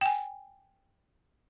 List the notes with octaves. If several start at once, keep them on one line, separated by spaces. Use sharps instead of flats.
G5 G#5